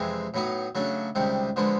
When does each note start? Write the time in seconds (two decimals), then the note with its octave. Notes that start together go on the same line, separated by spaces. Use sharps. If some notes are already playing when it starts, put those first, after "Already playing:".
Already playing: F2 C3 E3 G#3
0.34 A2 F#3 B3 D#4
0.75 C#3 F#3 A3 D4
1.15 C#2 C3 D#3 G3
1.56 D3 F3 G#3 B3